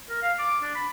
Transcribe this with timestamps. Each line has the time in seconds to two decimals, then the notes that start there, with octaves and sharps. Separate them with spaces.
0.09 A#4
0.22 F5
0.39 D6
0.63 D4
0.76 B5